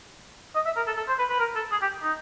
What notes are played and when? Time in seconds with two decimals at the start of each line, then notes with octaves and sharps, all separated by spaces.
0.55 D#5
0.66 E5
0.76 A#4
0.87 A4
0.97 A4
1.08 C5
1.19 B4
1.29 B4
1.39 A#4
1.56 A4
1.72 G#4
1.82 G4
2.03 D#4